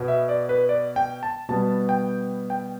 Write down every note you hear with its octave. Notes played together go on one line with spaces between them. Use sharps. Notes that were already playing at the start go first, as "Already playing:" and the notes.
Already playing: B2 B3
E5
D5
B4
D5
G5
A5
B2 G3 B3 A5
G5
G5